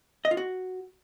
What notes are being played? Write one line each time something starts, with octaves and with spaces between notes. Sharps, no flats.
D#5
F4
F#4